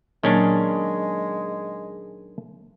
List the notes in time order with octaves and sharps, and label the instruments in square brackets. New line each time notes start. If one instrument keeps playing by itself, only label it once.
[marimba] A#2 F#3 A#3 [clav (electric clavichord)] D#3 C#4 D4 [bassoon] G#3